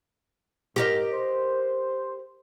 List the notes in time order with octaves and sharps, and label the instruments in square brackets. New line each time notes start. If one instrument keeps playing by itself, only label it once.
[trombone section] G#2 [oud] G4 A#4 D#5
[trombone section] C5